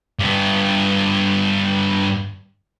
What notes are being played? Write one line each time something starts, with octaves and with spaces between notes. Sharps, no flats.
G2 B3